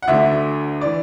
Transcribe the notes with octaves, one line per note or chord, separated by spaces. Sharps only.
F#5
D2 D3 E5
E3 D5